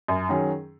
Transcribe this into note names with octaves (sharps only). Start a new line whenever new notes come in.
F#2
D#3 F#3 C#4 G#4